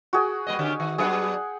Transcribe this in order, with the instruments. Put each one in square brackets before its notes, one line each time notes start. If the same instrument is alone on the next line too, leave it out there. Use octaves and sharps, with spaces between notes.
[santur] F#4 G#4 G5
[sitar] G3 A#3 D#5
D3 C#4 G4
D#3
[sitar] F#3 B3 D4 [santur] G#4 F#5 G5